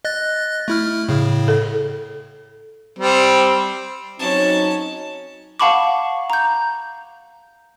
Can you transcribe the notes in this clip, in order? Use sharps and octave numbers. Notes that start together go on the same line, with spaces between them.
D#5 F#6 A6
A3 E4 F6
A2 C#3
A4
G3 C4
F#3 C4 C#4 D#4 A5
F5 F#5 A5 B5 C#6 D6
A#5 G6